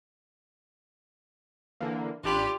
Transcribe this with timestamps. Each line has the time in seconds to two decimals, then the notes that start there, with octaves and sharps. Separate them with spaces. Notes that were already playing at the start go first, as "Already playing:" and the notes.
1.81 D3 E3 A#3
2.24 A1 D4 F4 G4 B5